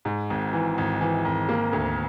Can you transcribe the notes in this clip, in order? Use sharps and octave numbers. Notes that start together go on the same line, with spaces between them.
G#2
G#1
E3
G#1
E3
G#1
A#3
D2